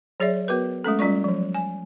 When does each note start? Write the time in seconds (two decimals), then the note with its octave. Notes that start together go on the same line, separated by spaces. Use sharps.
0.20 F#3 G#4 C#5 D5 E5
0.48 B3 F#4 A#4 B4
0.84 G#3 A3 C#4 A4
0.99 G3 C#4 F4 D5 C#6
1.24 F3 F#3
1.54 G#5